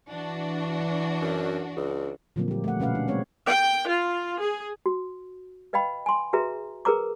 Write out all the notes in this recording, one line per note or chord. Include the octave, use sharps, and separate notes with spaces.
E3 D4 F#4
F#2
C#2
A#2 D3 F3 F#3 A#3 C4
G3 G4
A3 F#5
B2 C#4 B4 F5 F#5
D4
G#3 C4 C#5
G5
F4
G#4
F#4
B4 D#5 F5 G5 B5
G#5 C6
F#4 G#4 B4 E5 A#5
G#4 A#4 B4 A#5 D6